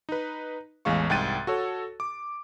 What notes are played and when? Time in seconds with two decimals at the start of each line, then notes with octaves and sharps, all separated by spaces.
0.09 D#4 B4
0.85 A1 E2 G#3 F5 C#6
1.10 C2 G#2 G5 F#6 A6 D#7
1.47 F#4 A4 C#5
2.00 D6